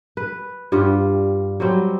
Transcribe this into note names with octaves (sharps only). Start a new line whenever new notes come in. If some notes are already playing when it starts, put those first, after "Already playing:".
B4
G2 G3 F4 F#5
F#3 G3 C4